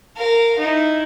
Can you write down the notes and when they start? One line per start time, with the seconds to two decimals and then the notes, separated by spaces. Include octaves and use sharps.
0.16 A#4 F5
0.58 D#4 E4